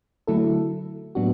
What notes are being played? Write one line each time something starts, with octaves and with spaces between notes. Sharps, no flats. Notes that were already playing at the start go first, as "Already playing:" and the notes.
D3 F#3 A3 E4 A4
A2 F#3 B3 D4 F#4